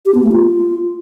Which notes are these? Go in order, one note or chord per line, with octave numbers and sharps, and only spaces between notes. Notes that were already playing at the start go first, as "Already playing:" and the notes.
G4
B3
A3
F4